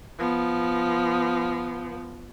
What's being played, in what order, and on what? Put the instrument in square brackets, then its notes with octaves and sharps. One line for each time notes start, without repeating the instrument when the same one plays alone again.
[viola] F3 B3